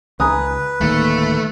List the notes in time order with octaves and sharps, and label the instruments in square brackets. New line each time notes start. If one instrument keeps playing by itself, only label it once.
[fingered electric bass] C#2 [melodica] B4 [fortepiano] G#5 A#5 D#6
[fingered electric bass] D1 D#3 A#3 [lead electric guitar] A3